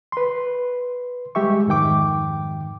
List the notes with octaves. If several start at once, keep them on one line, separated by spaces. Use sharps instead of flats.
B4 C6
G3 G#3 G4 E5 C#6
F2 G#2 D#3 G5 D6